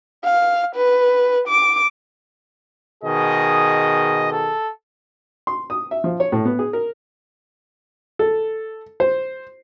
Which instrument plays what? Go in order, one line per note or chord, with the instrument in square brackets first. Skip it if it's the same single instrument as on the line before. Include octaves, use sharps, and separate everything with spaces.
[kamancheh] F5
B4
D6
[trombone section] B2 D#3 G#4 [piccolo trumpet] D#5
[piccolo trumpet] A4
[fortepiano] C6
D#6
E5
F3
C#5
A2
B3
G#4
A#4
A4
C5